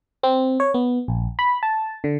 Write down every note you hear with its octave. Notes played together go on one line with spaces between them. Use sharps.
C4
C#5
B3
A#1
B5
A5
D3